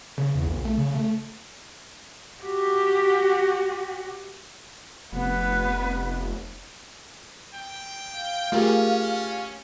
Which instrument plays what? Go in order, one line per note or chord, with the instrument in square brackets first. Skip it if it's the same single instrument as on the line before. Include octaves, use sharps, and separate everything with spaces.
[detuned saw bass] C#3
E2
A#1
A3
C#3
A3
[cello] F#4 G4
[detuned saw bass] F1 [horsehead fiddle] B3 B4
[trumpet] G5
[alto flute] F5
[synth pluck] A3 A#4 [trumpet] C#4 [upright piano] F4 G4 G#4